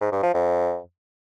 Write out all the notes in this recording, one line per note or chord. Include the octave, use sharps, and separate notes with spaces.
G#2
G2
F3
F2